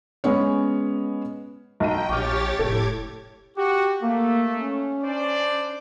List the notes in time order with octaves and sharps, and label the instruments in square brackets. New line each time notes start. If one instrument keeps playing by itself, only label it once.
[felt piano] G#3 B3 C#4 C#5
[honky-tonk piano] B1 A#5 D#7 [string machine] G5
[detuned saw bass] A#1 [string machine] G4 C#5 A6 [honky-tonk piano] C#6 D6 F6
[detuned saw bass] F1 [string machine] A2 D6 G#6 [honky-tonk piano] A4
[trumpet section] F#4 [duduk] G4
[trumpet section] A3 [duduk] A#3
[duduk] C#4
[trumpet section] D4 C5 D5